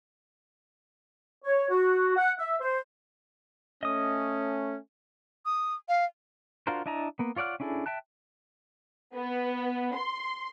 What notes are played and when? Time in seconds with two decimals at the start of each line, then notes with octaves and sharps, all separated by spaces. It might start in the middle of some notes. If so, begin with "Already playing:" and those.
1.45 C#5
1.70 F#4
2.16 F#5
2.39 E5
2.60 C5
3.83 A3 C#4 D#5 D#6
5.46 D#6
5.89 F5
6.67 D4 F4 F#4 A#4 C5
6.86 D4 E4 D#5 A5 A#5
7.19 A#3 B3
7.36 F4 C#5 D5 F#5 F6
7.60 C#4 D4 E4 G#4 A4
7.86 E5 G5 A5 F#6
9.15 B3
9.95 C6